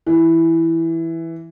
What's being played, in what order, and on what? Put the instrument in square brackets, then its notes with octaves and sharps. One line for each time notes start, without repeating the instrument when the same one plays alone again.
[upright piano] E3